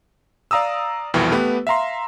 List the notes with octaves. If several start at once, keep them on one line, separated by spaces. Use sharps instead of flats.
D5 F5 A#5 D#6 E6
C2 F2 B2 E3 G5
A3 B3 G4 B4
E5 F5 A#5 C6